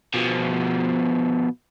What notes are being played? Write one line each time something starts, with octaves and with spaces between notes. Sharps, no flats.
B2 F3